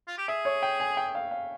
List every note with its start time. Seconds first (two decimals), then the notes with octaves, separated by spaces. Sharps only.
0.08 F4
0.18 G4
0.28 G#4 E5
0.45 C#5
0.63 G5
0.80 G#5
0.97 G5
1.15 F5
1.31 F5